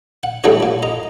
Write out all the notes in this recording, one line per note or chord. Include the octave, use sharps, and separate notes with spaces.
F#5
E3 G3 A3 D4 F#4 C#5
A#2
D#5 A#5